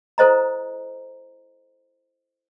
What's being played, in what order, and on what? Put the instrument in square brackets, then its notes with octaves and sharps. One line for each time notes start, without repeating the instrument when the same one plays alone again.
[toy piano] E4 A4 C5 D#5 A#5